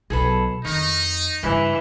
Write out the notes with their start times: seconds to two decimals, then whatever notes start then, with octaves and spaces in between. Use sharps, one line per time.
0.10 B1 G#4 A4 B4
0.65 F2 D#3 D#4
1.43 G2 C#3 E3